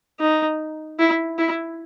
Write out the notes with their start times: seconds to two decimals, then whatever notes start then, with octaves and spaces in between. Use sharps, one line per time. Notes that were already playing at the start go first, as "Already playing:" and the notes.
0.20 D#4
0.99 E4
1.39 E4